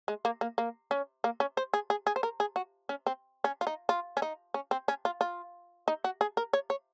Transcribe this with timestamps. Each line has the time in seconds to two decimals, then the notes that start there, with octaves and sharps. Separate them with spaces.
0.08 G#3
0.25 A#3
0.41 A#3
0.58 A#3
0.91 C#4
1.24 A#3
1.40 C#4
1.57 C5
1.74 G#4
1.90 G#4
2.07 G#4
2.16 C5
2.23 A#4
2.40 G#4
2.56 F#4
2.89 C#4
3.07 C4
3.44 C#4
3.61 F4
3.67 D#4
3.89 F4
4.17 C#4
4.22 D#4
4.54 C#4
4.71 C4
4.88 C#4
5.05 F4
5.21 F4
5.88 D#4
6.04 F#4
6.21 G#4
6.37 A#4
6.53 C#5
6.70 C#5